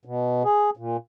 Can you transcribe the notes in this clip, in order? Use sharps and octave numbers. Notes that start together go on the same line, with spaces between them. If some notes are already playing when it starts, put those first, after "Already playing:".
B2
G#4
A#2